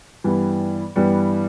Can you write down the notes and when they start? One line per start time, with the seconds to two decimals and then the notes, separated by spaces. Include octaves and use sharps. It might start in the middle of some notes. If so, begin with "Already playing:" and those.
0.24 G2 E3 G3 B3
0.96 G2 E3 G3 B3